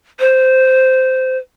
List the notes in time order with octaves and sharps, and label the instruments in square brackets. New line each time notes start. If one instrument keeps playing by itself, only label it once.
[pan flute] C5